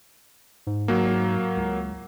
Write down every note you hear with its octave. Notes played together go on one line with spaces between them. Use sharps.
G#2
F#3 A#3
C#2